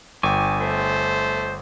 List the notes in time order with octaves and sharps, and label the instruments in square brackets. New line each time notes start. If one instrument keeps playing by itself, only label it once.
[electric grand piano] G1 G5 [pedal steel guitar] G#5 C#6 D6
[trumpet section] A3 C5